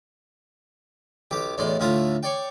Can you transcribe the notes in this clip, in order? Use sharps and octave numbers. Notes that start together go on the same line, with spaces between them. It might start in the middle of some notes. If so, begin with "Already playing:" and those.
B1 G4 D6
B1 E2 A2 D5 C6
D2 A2 E4 F4 D#6
C#5 D5 G5